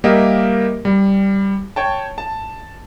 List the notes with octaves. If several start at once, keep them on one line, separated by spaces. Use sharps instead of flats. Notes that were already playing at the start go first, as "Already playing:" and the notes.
G3 A#3 G4 A#4 D#5 E5
G3
C#5 G5 A5
A5